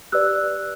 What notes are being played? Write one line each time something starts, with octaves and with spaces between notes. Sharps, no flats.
G4 B4 D5 E6 F#6